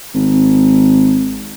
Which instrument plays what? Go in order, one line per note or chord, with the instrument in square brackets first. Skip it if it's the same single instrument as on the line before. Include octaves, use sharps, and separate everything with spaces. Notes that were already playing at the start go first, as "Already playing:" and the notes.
[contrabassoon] G#1